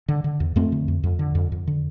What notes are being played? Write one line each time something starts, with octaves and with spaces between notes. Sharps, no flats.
D3
D3
E2
F2 A3 C4
D3
F2
F2
D3
F2
F2
D3